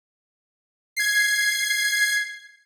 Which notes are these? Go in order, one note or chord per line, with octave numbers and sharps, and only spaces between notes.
G#6 C7